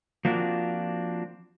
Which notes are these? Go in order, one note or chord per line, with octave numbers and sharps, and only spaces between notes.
F3 A#3 C4 D4 F4 F#4